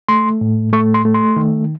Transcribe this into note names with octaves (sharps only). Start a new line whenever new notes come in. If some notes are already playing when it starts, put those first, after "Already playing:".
A3 C6
A2
A3 C#6
C6
A3
C6
D#3